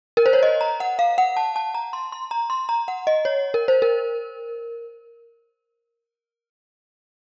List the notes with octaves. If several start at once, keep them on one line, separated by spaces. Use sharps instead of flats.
A#4
C5
C#5
D#5
A#5
F#5
F5
F#5
A5
A5
A#5
C6
C6
A#5
C6
A#5
F#5
D#5
C#5
A#4
C5
A#4